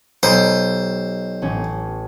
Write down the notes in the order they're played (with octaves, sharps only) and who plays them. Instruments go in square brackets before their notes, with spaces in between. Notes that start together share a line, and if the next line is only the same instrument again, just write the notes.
[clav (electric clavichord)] B1 [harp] G4 [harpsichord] C5
[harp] A1 C#4